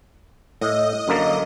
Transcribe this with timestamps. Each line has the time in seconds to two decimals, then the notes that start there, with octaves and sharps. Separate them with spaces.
0.61 A2 D#5
1.08 F#2 D3 A#3